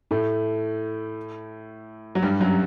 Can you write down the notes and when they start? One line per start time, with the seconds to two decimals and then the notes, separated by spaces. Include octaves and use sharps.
0.11 A2 A3
2.15 F#3
2.22 G2 G3
2.40 F#2 F#3